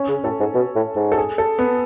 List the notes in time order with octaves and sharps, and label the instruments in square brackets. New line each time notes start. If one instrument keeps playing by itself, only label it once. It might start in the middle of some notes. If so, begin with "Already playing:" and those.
Already playing: [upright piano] C#4
[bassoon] C#3
[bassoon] A2 [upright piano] A4
[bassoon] G#2
B2
A2
G#2
[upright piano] A4
G#4
A4
B3